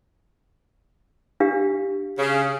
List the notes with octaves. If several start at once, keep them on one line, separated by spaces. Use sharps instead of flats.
D4 G4 F5
C#3